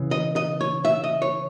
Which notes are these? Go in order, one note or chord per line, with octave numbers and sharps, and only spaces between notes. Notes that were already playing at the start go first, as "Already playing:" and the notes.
Already playing: C#3 E3
D#5
D#5
C#5
E5
D#5
C#5